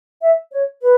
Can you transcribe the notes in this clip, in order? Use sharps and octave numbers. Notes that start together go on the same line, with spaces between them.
E5
C#5
B4